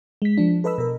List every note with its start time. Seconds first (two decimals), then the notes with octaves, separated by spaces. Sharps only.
0.22 G#3 B6
0.38 F3 D4
0.64 A4 B4 D#5 B5 E6
0.78 B2 A#4